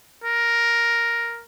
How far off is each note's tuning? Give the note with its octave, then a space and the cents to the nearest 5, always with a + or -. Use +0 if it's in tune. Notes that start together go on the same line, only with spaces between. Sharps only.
A#4 +5